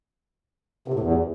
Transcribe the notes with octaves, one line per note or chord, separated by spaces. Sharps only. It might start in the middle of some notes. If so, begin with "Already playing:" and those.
C3
A2
E2